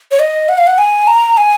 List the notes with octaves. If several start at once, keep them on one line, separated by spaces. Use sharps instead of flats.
C#5
D#5
F#5
F5
F#5
G#5
A#5
G#5